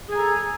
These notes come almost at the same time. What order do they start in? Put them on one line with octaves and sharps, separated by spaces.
G#4 G#5 A#5 A4